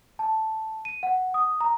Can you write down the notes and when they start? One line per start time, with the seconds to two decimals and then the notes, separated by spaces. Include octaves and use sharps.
0.19 A5
0.85 D#7
1.03 F#5
1.34 D#6
1.61 A#5